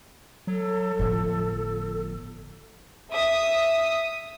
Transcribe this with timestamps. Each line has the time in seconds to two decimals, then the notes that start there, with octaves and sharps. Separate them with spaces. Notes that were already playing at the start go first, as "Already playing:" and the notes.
0.47 F#3 A4
0.99 G1 A2 F3
3.12 E5 D#6